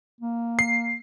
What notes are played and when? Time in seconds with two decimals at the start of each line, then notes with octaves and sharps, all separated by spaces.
0.21 A#3
0.59 C7